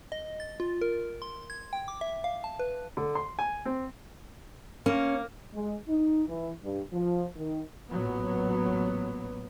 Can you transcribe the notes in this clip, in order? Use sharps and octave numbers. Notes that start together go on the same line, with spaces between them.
D#5
A6
F4
A#4
C6
G#6
G5
D6
E5
F5
A5
B4
D3
C6
G#5
C4
A#3 C#4
G#3
D#4
E3
G2
F3
D#3
A1 A#2 F#3 B3